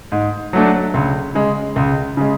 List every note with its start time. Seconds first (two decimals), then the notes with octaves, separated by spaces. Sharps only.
0.12 G#2
0.53 F#3 A3 D4
0.94 C#2
1.35 C#3 G#3
1.76 C#2
2.17 C#3 G#3